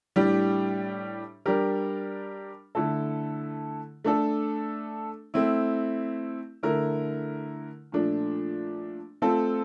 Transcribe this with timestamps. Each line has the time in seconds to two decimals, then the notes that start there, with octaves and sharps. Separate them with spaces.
0.16 A2 G3 D4 G4
1.46 G3 D4 G4 A#4
2.75 D3 A3 E4 A4
4.05 A3 D4 A4
5.34 A3 C4 E4
6.63 D3 A3 E4 A#4
7.92 A#2 F3 A3 D4
9.22 A3 C4 F4 A4